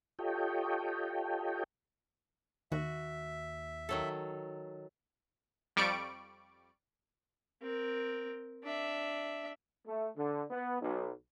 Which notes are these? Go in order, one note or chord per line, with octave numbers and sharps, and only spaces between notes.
F4 G4 A4 C#5 D#5 G5
D#2 F#4 E5
D#3 F#3 A4
F2 G3 D5 C#6 D7
C4 A#4
D4 E5
A3
D3
B3
B1